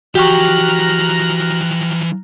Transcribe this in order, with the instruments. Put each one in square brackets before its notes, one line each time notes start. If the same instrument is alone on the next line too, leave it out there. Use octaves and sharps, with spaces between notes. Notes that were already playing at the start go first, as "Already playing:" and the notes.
[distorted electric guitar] E3 F3 [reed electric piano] F#4 C#6 [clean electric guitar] G4 [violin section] A#5 F6 F#6